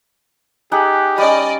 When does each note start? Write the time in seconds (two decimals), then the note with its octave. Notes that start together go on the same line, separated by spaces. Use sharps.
0.72 D#4 G4 G#4 F#5
1.18 G3 C#4 D5 D#5